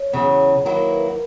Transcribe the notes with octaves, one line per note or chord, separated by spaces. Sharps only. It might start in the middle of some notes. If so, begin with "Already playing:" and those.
Already playing: C#5
E2 C#3 F#3
D#3 F#3 A#3 E4 A#4
B4